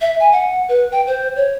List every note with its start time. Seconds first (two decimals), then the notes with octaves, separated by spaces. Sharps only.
0.01 E5
0.20 G#5
0.33 F#5
0.69 B4
0.92 G5
1.07 C5
1.36 C#5